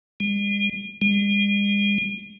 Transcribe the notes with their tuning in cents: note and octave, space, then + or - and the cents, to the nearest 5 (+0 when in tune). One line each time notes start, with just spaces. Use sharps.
G#3 -45
G#3 -45